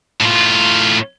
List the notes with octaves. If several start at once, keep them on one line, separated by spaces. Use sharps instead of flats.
A2 F4